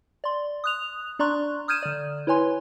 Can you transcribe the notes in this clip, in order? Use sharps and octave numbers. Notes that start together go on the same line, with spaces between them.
D5 C6
D#6 F#6 F7
D4 D5 A#5 C6 C#6 F#6
D#6 F6 G6 G#6 D#7 E7
D3 D5
E4 B4 C#5 G#5 C6